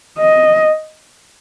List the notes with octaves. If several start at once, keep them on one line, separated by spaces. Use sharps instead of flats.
D#5